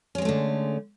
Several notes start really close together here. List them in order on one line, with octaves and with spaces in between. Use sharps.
C#4 G#3 C4 A3 D3